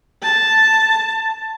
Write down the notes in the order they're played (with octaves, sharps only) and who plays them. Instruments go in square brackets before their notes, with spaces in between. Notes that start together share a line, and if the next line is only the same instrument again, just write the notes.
[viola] A5